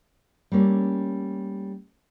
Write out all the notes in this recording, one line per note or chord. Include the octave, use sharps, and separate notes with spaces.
G3 A3 A#3 C#4